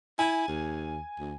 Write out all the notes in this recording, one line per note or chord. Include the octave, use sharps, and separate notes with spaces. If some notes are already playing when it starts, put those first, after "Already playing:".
E4 G#5
D#2
D2